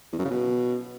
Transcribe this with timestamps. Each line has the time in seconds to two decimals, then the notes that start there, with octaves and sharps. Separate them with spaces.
0.13 E2
0.19 F#2
0.25 C#3
0.31 B2